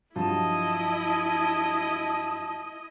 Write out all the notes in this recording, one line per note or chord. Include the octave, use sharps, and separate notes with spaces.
G2 F3 F#3 E4 D#5 A5